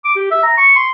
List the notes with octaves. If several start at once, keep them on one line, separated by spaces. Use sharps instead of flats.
D6
G4
E5
A#5
C#6
C6